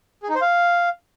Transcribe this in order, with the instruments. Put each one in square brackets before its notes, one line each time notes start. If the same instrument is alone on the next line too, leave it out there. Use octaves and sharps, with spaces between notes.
[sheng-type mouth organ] G#4
D#4
C5
F5